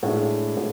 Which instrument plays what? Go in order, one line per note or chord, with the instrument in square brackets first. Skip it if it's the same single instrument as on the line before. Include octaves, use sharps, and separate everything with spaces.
[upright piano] A2 G#3 D4
A2